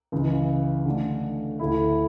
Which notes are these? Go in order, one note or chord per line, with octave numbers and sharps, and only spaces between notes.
C#2 C#3 E3
D3 A3 D4
D2 D3 A3 E4